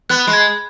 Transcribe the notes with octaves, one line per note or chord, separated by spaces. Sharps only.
B3 F#6
G#3
G#6